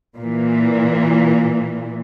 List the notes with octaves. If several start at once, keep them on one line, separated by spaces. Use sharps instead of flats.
A#2 E3